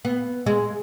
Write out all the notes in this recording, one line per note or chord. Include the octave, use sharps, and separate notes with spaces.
B3
G#3